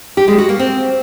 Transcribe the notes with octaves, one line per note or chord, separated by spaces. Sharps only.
G4
G#3
F#4
A#3
C4